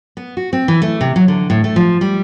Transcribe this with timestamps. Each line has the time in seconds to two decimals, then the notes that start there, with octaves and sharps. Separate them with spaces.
0.17 B3
0.37 F#4
0.53 C4
0.68 E3
0.82 A3
1.01 C3
1.16 F#3
1.28 D3
1.50 A2
1.64 A3
1.76 F3
2.01 G3